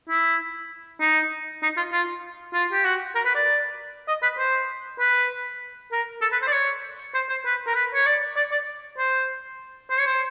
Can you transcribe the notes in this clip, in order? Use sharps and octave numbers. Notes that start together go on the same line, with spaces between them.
E4
D#4
D#4
F4
F4
F4
G4
F#4
A#4
B4
D5
D#5
B4
C5
B4
A#4
A4
B4
C5
D5
C#5
C5
C5
B4
A#4
B4
C#5
D5
D5
D5
C5
C5
C#5
C5